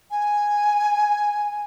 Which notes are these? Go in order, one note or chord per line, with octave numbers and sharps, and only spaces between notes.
G#5